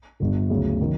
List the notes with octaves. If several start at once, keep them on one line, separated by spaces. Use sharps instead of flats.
G1 G2 D3
D2 C#3 F#3
D#3 F#3